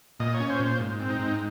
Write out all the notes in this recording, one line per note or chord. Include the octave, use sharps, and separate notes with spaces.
A#2 D#5
C#5
C#4
C5
A#2
C5
G#2
C4
D#4
G#2